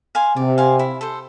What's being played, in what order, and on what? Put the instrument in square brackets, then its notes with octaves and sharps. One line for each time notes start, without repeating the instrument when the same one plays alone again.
[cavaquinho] F5 G#5 C6
[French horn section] C3 [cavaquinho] D5
[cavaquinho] F5 G#5 C6
E4
A4 C5